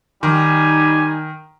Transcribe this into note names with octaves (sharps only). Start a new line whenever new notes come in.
D#3 G3 D#4 G#5